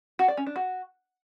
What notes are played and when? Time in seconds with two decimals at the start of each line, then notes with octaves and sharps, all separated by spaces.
0.19 F#4
0.28 D5
0.37 C#4
0.47 D4
0.56 F#4